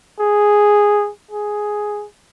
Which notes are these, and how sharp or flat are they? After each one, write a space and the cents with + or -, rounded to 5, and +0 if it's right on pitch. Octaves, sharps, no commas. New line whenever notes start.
G#4 -5
G#4 +5